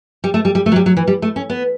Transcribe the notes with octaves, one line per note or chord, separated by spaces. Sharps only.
G3
A3
G3
G3
A3
F#3
G3
F#3
E3
G3
A3
C#4
B3